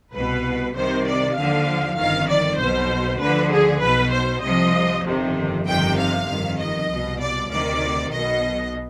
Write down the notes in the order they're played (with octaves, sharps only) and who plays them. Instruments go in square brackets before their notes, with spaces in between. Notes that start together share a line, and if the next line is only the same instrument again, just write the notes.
[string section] C2 B2 B4
C2 C3 D#3 C5
D5
D#2 D3 F3 F5
G1 F2 D#3 F5
D5
B1 B2 C5
D2 D3 F3 B4
G#4
B1 B2 B4
C5
C2 C3 F3 D#5
G1 F2 C3 D#3
G1 F2 C3 D#3 G5
F5
G1 F2 D#3
D#5
C2 B2
D5
D2 C3 D#3 D5
B1 B2 D#5